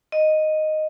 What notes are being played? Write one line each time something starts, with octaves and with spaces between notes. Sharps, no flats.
D#5